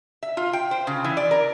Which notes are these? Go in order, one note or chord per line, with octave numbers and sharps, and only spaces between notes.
E5
F4
G5
C5
C#3
E3
D5
A#4